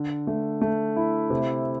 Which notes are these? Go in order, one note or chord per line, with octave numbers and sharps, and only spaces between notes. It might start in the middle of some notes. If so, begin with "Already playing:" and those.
Already playing: D3
A3
A3
E4
C3